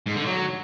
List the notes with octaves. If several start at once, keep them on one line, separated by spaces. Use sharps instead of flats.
G#2
D3
F#3